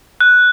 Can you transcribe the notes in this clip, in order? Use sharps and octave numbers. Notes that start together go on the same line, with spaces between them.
F#6